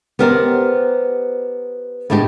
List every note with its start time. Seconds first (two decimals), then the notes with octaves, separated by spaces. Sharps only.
0.19 B3 G4 A#4 C5 D5
2.10 A2 G#3 B3 D4 G4